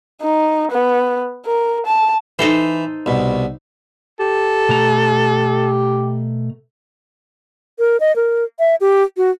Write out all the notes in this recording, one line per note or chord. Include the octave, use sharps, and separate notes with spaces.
D#4
B3
A#4
A5
E3 D#4 A4 C5
C2 B2
G4 A4
B2 A3 A#5
A#4
D#5
A#4
E5
G4
F#4